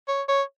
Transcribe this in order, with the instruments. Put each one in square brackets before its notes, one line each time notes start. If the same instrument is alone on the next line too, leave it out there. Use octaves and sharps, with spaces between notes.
[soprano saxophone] C#5
C#5